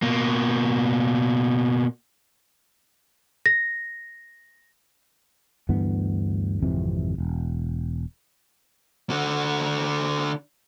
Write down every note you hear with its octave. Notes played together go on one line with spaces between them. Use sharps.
B2 A#3
A#6
D2 G2 E3 B3
G#1 F2 C3 E3
E1
D3 F#4